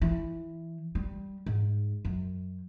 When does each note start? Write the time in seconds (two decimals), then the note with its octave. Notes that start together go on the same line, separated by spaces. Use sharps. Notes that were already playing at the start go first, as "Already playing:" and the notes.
0.02 E3
0.95 G3
1.46 G#2
2.05 F#2